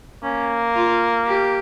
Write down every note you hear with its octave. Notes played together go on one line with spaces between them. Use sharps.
A#3 C#4
F4
G4